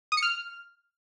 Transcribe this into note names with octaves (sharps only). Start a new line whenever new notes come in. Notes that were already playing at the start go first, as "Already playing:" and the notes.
D#6
C#7
F6